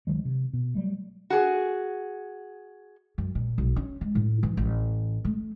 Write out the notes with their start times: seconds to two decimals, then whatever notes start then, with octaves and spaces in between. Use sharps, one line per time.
0.07 C#2 D#3 F#3 G#3
0.25 C3
0.53 B2
0.75 F#3 G3 A3
1.30 F#4 G#4
3.18 F#2
3.35 A#2
3.58 B1
3.76 C#4
4.01 G#3
4.15 A2
4.43 E3
4.57 A1
5.25 A3